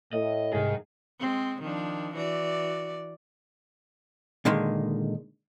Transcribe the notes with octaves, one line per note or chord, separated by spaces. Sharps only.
A2 D#5
C2 G#2 D#3 G#4 D#5
G#3 C4
D#3 F3 D4
E3 F#4 D5
A#2 D3 D#3 G#3